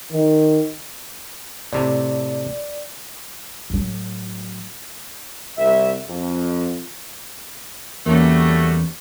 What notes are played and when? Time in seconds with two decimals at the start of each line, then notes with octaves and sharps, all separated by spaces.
0.13 D#3
1.73 A2 C3 D5
3.70 A2 F#3
5.57 C2 E5
6.08 F2
8.06 E2 G3 A3 A#3 C#4 F#4